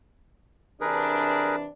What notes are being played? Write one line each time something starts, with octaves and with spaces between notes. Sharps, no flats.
C3 E3 D4 G#4 A#4 B4